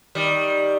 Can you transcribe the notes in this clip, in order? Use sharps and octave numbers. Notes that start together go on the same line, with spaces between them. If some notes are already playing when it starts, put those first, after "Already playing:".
D#3 G3